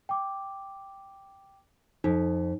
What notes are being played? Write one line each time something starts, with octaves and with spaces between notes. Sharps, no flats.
G5 D6
F2 D#4